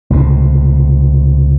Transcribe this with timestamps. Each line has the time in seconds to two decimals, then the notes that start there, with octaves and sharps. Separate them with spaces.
0.10 C#2 A2 C3